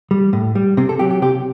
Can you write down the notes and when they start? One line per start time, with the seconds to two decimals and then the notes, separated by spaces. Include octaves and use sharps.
0.11 G3
0.33 A2
0.55 G3
0.77 C3 C4
0.89 A4
0.99 F#3 G4
1.11 G4
1.22 C3 G4